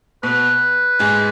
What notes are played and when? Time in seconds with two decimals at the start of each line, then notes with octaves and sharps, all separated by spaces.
0.23 B2 B3 B4
0.99 G#2 G#3